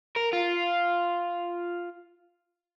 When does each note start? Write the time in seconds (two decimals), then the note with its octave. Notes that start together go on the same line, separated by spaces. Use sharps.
0.16 A#4
0.33 F4